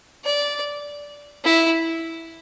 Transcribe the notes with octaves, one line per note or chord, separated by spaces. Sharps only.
D5
E4